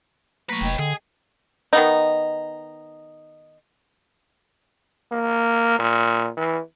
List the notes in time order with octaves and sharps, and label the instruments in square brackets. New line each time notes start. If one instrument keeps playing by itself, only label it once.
[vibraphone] F#3 A3 A#3 [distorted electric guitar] B4 C#5
[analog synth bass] F1 [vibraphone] D#5 G5
[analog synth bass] D3 [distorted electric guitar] G#4
[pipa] D#3 B3 D#4
[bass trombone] A#3
A#2
E3